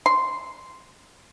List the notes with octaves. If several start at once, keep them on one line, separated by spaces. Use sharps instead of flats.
C6